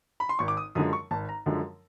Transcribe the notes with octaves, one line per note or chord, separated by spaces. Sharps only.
B5
C6
G#1 C#6
D6
D#6
F#2 D3 F3 G#3 D#6
C#6
G#1 A5
A#5
F#2 D3 F3 G#3